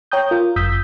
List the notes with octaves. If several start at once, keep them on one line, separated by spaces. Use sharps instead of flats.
C#5 G5 A#5 D#6 G6
F4 A#4
G1 F#2 D#6 E6 G6 B6